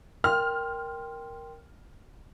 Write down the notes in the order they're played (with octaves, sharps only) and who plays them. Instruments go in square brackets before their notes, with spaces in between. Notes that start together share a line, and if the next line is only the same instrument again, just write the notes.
[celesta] A#4 G5 C6 [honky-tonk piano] F6